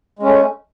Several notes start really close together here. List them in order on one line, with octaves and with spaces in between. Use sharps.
G#3 C#4 A3